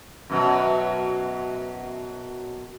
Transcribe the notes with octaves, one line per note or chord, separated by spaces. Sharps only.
F#2 B2 F#3